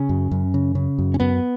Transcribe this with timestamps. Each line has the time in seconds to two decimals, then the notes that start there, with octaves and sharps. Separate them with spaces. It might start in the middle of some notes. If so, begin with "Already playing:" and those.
Already playing: C#3 C#4
0.09 F#2
0.31 F#2
0.54 C#3
0.75 C#3
0.98 F#2
1.14 C#4
1.20 F#2 B3